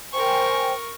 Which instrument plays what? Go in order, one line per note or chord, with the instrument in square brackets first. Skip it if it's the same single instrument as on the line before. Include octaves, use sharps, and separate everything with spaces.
[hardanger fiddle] A#4 C#6 [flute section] C5 G5 G#5